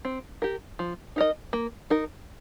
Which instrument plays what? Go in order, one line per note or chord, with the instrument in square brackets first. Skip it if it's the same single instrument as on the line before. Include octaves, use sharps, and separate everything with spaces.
[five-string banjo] C4
G4 A#4
F3
D#4 A#4 D#5
A#3
D#4 A#4